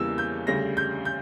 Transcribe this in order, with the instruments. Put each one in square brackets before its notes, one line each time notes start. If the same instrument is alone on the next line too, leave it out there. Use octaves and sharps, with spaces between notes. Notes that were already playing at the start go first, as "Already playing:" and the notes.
Already playing: [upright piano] E2 C#3 E3 G3 A#3 E6
G6
D2 C#3 G3 A#6
G6
G6